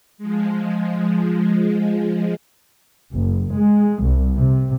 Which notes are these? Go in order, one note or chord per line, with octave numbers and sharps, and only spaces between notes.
F3 G#3
F#1
G#3
C2
C3